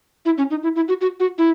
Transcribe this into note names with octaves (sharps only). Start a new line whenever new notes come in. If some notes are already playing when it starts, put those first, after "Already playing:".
E4
C#4
D#4
E4
E4
F#4
F#4
F#4
E4